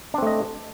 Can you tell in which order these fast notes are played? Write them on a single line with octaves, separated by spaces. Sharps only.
D4 C4 A3 D#5